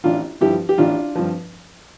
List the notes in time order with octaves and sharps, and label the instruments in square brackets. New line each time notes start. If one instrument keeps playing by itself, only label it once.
[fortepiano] A1 D4 F4
G2 F3 E4 G4
G4
A1 D4 F4
G2 F3